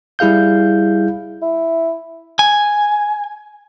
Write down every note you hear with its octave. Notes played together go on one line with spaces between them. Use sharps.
G3 E4 G#4 F5 G6
E4
G#5